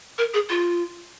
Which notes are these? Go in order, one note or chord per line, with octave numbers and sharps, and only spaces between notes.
A#4
G#4
F4